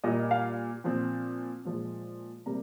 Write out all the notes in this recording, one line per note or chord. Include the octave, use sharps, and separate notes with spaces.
A#2 G3 A#3 D#5
F5
A#2 F3 C4
A#2 F3 G#3
C3 G3 A#3 A#5